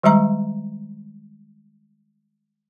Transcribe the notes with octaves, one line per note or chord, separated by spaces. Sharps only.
D#3 G3 G#3 E5 A#5